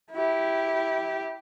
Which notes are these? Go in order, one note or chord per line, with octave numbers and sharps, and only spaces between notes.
E4 G4